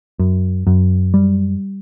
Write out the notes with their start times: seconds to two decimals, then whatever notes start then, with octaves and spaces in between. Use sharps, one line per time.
0.19 F#2
0.67 F#2
1.14 G3